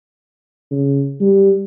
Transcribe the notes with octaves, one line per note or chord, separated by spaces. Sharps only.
C#3
G3